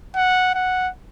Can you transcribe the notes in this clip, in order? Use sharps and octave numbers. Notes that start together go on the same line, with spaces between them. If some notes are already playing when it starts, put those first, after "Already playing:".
F#5
F#5